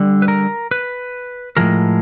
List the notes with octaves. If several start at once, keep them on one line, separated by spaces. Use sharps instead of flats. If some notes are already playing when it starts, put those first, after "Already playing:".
Already playing: D3 G3
B4
A#4
B4
A2 F3 G#3 A#4